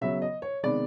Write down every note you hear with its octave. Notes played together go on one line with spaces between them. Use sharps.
C#3 F#3 B3 E5
D#5
C#5
C3 D#3 G#3 B3 D5